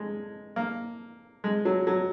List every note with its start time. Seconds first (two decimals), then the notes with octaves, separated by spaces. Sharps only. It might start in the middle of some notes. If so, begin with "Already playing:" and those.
Already playing: G#3
0.56 A#3
1.44 G#3
1.65 F#3
1.87 F#3